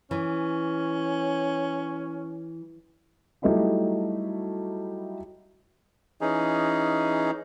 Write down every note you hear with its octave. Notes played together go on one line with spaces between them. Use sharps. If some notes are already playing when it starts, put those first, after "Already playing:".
E3 C#4
F#3 G3 A3 D#4 E4 F#4
E3 C#4 D#4 G#4